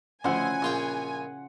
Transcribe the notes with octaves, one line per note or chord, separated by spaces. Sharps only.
D2 C#3 F3 E4 F#5 G#5 C6
A#1 F4 G5